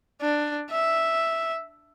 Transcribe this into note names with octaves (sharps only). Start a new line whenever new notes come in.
D4
E5